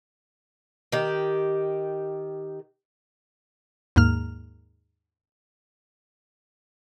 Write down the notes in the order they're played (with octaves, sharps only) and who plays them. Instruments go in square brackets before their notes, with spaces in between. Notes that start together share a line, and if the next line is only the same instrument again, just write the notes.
[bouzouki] D#3 G4
[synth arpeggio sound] D#2 G#2 A#3 F6